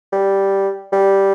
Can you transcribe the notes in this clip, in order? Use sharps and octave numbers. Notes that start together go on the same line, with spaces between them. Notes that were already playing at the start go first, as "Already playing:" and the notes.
G3
G3